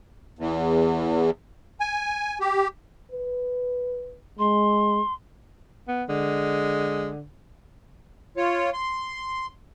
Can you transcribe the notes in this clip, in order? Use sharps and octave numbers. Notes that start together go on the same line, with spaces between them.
E2
G#5
G4
B4
G#3 C6
B3
D3 G#3
F4 C#5
C6